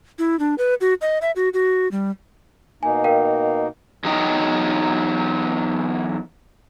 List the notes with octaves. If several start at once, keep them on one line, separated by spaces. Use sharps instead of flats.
E4
D4
B4
F#4
D#5
E5
F#4
F#4
G3
B2 A#3 D#4 G#5
A#4 F5 G5
E2 F#3 D#4 D#5 G5